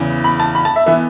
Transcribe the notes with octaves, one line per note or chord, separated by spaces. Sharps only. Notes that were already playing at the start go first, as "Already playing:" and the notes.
Already playing: E2 C#3 E3 B3
B5
A5
B5
A5
E5
E3 B3 E5